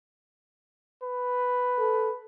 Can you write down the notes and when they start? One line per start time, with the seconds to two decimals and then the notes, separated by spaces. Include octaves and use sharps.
1.03 B4
1.79 A4